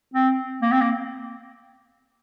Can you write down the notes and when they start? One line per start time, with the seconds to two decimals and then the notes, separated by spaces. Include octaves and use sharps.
0.14 C4
0.62 A#3
0.72 C4
0.81 A#3